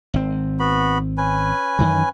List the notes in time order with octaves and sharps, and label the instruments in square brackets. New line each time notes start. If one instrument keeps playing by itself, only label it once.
[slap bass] G#1 C4
[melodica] B3 F#4 B5
C#4 B4 G#5
[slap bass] F#2 D#3 E3